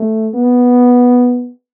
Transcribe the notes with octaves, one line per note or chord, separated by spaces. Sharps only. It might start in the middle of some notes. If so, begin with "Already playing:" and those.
Already playing: A3
B3